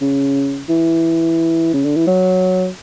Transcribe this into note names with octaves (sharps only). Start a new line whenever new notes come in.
C#3
E3
C#3
D3
E3
F#3